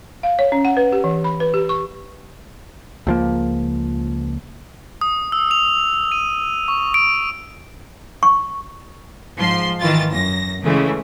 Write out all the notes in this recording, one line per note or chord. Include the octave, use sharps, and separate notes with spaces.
F5
C#5
C#4
F#5
B4
G4
E3
B5
B4
G4
C#6
C#2 F3 A#3
D#6
E6
F7
D#7
C#6
D7
C#6
G#2 F3 C6
D#3 E3 F4 A6
F#2 A#6
C#3 E3 G#3 A3